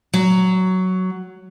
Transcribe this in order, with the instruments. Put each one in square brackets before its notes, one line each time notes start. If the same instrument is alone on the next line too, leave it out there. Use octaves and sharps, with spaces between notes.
[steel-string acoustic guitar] F#3